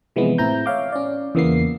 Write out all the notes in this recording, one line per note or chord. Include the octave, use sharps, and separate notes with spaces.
C3 E3 F3 G#3 B3
A2 C4 E4 A#5 G6
C#5 E5 F5 D6
C#4 D5
E2 C#3 E3 A#3 B3 C7